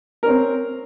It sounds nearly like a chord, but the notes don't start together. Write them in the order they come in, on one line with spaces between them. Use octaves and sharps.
A#4 C#4 C4